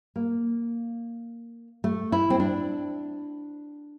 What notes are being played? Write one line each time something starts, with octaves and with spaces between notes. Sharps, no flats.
A#3
A3
E4
C4
D4